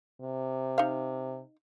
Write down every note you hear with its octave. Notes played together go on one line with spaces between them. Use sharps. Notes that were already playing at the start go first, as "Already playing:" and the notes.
C3
D#4 F5